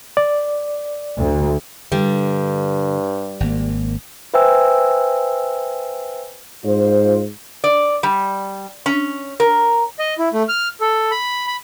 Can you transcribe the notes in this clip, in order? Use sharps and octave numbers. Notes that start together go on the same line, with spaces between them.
D5
D2
G2 D3 G3
G#1 A#3
B4 C5 E5 G5 G#5 E6
G#2 F4 C5
D5
G3
C#4
A#4
D#5
E4
A3
F6
A4
B5
B5